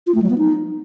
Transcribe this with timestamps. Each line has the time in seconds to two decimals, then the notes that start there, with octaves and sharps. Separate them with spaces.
0.07 F4
0.15 A3
0.22 F#3
0.30 B3
0.38 D#4